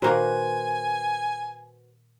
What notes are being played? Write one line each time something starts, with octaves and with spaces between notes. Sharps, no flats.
A#2 D#3 A#3 F#4 B4 C5 G#5